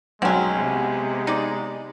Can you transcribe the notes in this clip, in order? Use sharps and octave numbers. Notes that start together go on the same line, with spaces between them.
B1 F#3 G#3 C4 C#4
C3 B3
D#4 D5